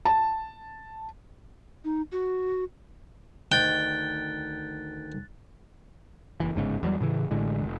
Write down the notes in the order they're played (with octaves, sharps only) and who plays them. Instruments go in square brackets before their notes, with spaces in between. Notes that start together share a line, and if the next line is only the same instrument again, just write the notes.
[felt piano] A5
[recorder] D#4
F#4
[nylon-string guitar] D2 D#3 D#5 [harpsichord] G5 [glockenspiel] F#6 A6
[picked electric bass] F#1 E3
G1 G#2 C#3
E2 F#3 G3
A2 C#3 E3
A1 A2 D3 G#3
F1